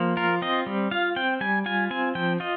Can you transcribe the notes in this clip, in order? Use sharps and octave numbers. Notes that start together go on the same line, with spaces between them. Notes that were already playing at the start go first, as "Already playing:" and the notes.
Already playing: F3 A#3
F4 A#4
C4 D#5
G3
F4 F5
C4 G5
G3 G#5
F4 G#5
C4 G#5
F3 G5
F4 D#5